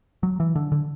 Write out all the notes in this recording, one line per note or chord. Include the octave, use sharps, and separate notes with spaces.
F#3
E3
D3
D3